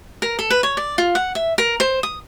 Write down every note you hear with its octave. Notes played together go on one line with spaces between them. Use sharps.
A#4
A4
B4
C#5
D5
F4
F#5
E5
A#4
C5
D#6